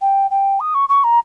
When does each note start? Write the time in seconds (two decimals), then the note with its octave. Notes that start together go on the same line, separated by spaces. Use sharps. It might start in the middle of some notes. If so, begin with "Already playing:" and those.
0.01 G5
0.30 G5
0.60 D#6
0.74 C#6
0.88 C#6
1.03 A#5